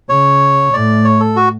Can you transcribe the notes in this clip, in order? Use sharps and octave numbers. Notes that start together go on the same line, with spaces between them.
C#3 C#5
A2 D5
C#5
A4
F#4